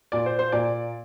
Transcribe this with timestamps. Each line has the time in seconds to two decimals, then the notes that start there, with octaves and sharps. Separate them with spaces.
0.12 A#2 D5
0.26 C5
0.39 C5
0.52 A#2 D5